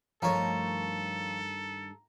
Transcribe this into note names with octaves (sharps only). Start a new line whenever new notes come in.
G2 D#3 F3 A3 A4 C#5 A#5